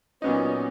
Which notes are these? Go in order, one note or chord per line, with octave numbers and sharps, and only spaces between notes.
A#2 F#3 B3 C#4 D#4